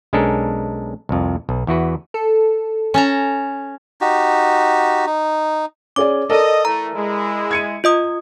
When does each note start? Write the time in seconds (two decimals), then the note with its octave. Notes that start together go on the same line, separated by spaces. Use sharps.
0.13 B1 G#3 C#4 D4 A4 A#4
1.09 C2 F2
1.49 B1
1.67 E2 E3 F#4 B4
2.14 A4
2.94 C#4 A5 A#5
4.01 D#4 F#4 G4
5.06 D#4
5.96 C#4 G#4 D5 D6
6.30 A4 A#4 D5 D#5
6.65 E3 A3 A#5
6.95 G#3 E4
7.51 G#6 C#7 D#7
7.84 F4 D#5 D#6